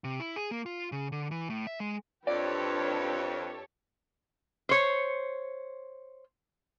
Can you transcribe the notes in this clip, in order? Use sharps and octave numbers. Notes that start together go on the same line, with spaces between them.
C3
E4
G#4
A#3
F4
C#3
D3
E3
A2
E5
G#3
F2 D4 G4 A4 B4 C#5 D5
C5 C#5